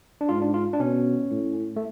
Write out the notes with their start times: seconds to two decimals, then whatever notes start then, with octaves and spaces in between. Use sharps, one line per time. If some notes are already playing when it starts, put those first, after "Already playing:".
0.21 D4
0.29 G#2 F4
0.42 D4
0.54 F4
0.73 D4
0.80 B2 C#4
1.31 A2
1.76 A3